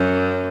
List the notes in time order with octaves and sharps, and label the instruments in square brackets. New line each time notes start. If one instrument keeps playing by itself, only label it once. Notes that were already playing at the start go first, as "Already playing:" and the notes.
Already playing: [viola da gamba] F#2